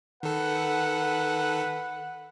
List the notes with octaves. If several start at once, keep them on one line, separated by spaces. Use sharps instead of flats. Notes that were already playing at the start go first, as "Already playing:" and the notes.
D#3 A4 B4 F#5